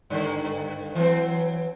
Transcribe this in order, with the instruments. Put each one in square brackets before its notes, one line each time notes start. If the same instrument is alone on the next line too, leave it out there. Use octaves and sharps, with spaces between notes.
[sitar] G2 D3 D#3
E3 F#3 C4